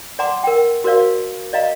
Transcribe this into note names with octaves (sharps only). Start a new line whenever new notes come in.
D5 F#5 G#5 A#5 C6 D6
A#4 G5
F#4 A#4 C5 D5 F5
D5 D#5 F5 A#5